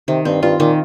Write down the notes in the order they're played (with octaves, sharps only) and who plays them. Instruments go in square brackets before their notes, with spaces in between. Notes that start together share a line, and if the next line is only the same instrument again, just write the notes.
[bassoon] C3 [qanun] D#3
[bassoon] G2 [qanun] C4
[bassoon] G2 [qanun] F4
[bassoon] A#2 [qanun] D#3